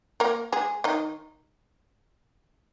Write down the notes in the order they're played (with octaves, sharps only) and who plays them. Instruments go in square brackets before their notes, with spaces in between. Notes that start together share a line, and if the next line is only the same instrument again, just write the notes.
[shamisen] A#3 A#4
G#3 G#4
D#3 D#4